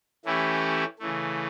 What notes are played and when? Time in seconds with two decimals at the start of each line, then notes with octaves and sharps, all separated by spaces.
0.25 E3 A3 C#4 E4 G4
0.99 C#3 E3 A3